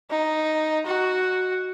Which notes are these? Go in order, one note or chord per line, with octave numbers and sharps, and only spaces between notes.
D#4
F#4